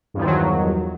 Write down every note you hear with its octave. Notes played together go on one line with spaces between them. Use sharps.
E2 G2 D#3 F3 F#3